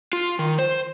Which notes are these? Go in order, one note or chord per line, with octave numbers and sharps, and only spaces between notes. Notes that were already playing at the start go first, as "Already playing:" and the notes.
F4
D#3
C5